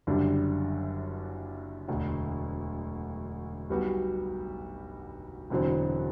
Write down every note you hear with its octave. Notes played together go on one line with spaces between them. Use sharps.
F#1 F#2 D3 G3 D4
E1 D2 D3
B1 B2 G3 B3 F#4
E1 E2 D3 F#3 C4